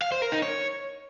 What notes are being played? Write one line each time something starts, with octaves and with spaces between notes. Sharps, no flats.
F5
C5
A#4
D#4
C#5